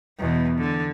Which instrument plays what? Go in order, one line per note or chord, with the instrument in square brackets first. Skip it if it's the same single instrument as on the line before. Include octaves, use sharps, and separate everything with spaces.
[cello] E2 B2
D3